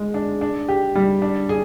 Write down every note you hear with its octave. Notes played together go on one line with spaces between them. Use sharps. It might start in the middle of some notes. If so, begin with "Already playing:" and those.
Already playing: G#3
D4
D4
G4
G3
D4
G#4